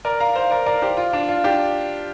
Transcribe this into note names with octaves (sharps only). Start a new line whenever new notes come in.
A#4 D5
F5 A#5
C5 F5
A#4 D5
A#4 D5
G4 C5
F4
D4
F4
D4 G4